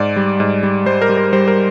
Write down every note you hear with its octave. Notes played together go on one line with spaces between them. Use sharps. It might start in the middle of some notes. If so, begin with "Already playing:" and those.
Already playing: G#2 D5
G3
G#2
G3
G3 C5
A#4
G3
A#4
G3 C5
A#4